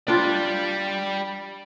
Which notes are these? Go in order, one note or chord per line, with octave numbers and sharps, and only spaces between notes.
G3 D4 F4 G5